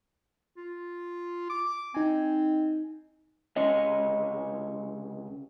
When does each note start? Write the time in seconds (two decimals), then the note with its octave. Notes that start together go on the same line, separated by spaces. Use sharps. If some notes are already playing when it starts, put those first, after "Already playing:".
0.57 F4
1.50 D6
1.94 C4 D#4 G#5
3.56 C#2 C3 C#4 C#5 D#5